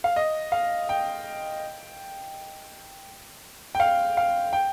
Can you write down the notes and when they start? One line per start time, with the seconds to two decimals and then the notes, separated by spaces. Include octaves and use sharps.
0.04 F5
0.16 D#5
0.52 F5
0.89 G5
3.75 G5
3.80 F5
4.17 F5
4.53 G5